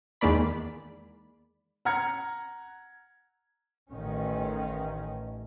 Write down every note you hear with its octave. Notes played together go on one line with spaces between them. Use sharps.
E2 D#3 G#3 A#3 D5 B5
F#5 A#5 F6 G#6 C#7
A1 D#3 C#4